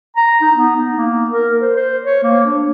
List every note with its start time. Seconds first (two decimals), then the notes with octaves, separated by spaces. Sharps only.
0.17 A#5
0.42 D#4
0.55 B3
0.76 D#4
0.97 A#3
1.30 A#4
1.61 C5
1.76 C5
2.04 C#5
2.23 A#3
2.45 D4